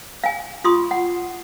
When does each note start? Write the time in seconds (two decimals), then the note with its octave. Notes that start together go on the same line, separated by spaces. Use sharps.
0.24 F5 G#5
0.64 F4 C6 C#6 D#6
0.91 F#5